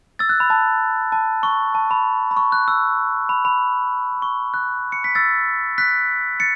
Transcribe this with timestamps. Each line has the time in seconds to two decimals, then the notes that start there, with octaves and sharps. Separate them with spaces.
0.19 E6 A6
0.29 F#6
0.40 B5
0.50 A5
1.12 A5
1.43 C#6
1.75 A5
1.91 B5
2.31 B5
2.37 C#6
2.52 F#6
2.68 E6
3.29 B5
3.45 B5
4.22 C#6
4.54 F#6
4.92 C#7
5.04 B6
5.15 E6 A6
5.78 F#6 B6
6.40 A6 C#7